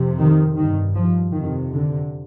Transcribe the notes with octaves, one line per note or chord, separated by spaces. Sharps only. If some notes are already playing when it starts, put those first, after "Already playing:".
Already playing: F2 C3
D#3
G2 D#3
F3
F2 C3 D#3
D3